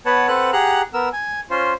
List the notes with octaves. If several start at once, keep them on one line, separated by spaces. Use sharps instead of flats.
B3 B4 C#5 F#5 A5
C4 A4 B4 F#5 F#6
G4 G#4 F#5 A#5 F#6
B3 A#4 E6
G#5
C#4 F4 C5